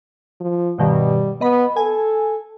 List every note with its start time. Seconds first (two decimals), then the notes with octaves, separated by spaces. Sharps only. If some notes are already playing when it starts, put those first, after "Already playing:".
0.41 F3
0.78 G2 B2 D#3 G3
1.41 B3 D#5 B5
1.76 A4 G#5